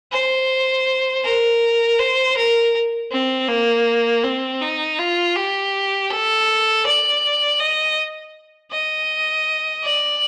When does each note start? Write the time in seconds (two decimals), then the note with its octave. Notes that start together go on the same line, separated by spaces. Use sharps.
0.12 C5
1.24 A#4
1.99 C5
2.37 A#4
3.11 C4
3.48 A#3
4.23 C4
4.61 D#4
4.99 F4
5.35 G4
6.11 A4
6.86 D5
7.60 D#5
8.72 D#5
9.84 D5